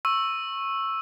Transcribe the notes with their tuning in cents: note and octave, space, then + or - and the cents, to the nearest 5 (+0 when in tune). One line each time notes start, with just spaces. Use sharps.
C#6 -20 E6 +0